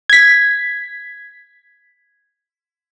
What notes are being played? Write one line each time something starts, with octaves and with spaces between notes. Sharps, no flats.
G#6 B6